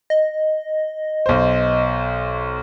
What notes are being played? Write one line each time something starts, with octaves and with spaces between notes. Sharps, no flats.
D#5
B1 C5